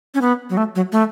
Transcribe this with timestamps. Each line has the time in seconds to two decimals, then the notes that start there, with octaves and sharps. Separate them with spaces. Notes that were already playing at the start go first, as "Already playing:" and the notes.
0.14 C#4
0.21 B3
0.50 F#3
0.57 A3
0.75 F#3
0.92 A3